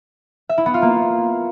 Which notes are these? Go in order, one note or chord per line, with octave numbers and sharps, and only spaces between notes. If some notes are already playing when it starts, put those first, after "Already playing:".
E5
E4
B3
F4
A#3